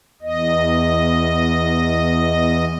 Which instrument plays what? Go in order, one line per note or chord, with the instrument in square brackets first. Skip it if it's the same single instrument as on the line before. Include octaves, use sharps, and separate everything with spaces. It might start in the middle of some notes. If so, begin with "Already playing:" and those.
[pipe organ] E2 D#5